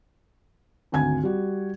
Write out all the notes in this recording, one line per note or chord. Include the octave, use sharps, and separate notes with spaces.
G#1 D2 G#5 G#6
G3 F#4